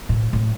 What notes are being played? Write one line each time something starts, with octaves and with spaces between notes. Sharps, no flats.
A2
A2